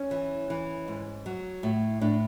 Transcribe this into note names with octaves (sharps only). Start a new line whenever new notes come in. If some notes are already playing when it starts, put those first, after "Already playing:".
Already playing: C#4
E3
E3
G#2
F#3
A2
A2 D4